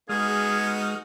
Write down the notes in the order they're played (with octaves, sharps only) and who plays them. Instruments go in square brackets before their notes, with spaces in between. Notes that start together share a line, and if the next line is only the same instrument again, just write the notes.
[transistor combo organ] G#3 D#6 F6 [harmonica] B3 D#4 F#4 [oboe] G#4